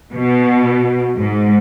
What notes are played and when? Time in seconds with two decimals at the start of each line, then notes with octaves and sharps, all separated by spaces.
0.13 B2
1.17 G#2